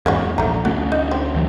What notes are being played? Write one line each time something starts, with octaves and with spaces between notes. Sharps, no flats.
E2 G#2 A#3 C#4 F#4
A#1 A3 A#5
D2 A3 C#4 F#4
D#4
C4
D2 E3 F#3